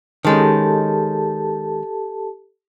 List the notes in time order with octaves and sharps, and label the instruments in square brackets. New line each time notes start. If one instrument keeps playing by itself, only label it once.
[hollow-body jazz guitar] D#3 G#3 C#4 [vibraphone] G4 A4 A5